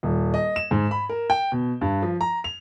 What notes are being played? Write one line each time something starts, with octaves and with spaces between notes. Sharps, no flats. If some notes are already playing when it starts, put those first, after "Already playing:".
D#1
D#5
E7
G#2
B5
A#4
G5
B2
G2
F3
A#5
F7